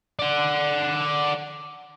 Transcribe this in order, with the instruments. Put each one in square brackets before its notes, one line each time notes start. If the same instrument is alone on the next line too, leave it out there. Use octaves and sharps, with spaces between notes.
[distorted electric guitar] D5 F#5